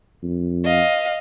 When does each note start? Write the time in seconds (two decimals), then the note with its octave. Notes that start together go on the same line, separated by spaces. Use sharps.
0.23 F2
0.64 D#5 F5